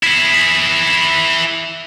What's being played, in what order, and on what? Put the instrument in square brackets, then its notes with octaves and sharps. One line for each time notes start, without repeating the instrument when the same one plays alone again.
[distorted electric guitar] E4 G#4